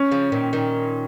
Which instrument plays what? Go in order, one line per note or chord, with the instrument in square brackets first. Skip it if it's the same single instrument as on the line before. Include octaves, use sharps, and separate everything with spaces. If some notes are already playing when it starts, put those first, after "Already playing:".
Already playing: [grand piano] C#4
[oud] C#3 F3
A#2 D#3
A#2 D#3